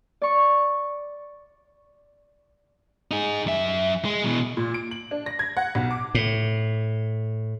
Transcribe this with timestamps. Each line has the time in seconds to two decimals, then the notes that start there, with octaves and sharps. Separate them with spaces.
0.22 D5 C#6
3.11 D#4 G#4
3.46 F#2 E5
4.05 G#3
4.25 B2 E3
4.57 A#2
4.74 D7
4.91 F#7
5.11 D4
5.26 A#6
5.39 G#6
5.57 F#5
5.75 B1
5.91 D6
6.15 A2